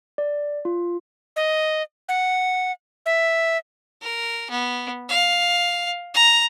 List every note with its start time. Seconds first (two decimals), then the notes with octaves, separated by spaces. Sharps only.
0.18 D5
0.65 F4
1.36 D#5
2.09 F#5
3.06 E5
4.02 A#4
4.50 B3
5.09 F5
6.14 A#5